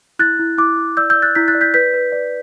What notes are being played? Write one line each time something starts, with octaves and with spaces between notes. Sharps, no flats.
E4 F#6 A6
E4
E4 D6 F#6
E4
D5 E6 G6
E6 G6
D5
F#6 A6
E4 G6 B6
F#6 A6
D5
G6 B6
B4 G6 B6
B4
D5